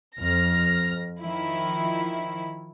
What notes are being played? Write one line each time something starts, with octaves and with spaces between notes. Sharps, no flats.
F2 F6 A#6
D#3 F3 E4